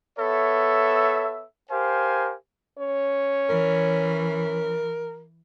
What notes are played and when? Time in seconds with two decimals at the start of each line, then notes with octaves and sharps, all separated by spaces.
0.19 B3 A4 C#5 E5
1.70 G4 A#4 C5 F5 G#5
2.79 C#4 C#5
3.49 E3 A#4